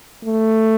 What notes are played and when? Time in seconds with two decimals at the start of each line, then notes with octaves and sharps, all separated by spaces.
0.25 A3